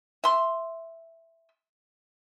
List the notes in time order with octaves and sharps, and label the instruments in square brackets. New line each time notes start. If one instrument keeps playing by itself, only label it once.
[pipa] E5 C6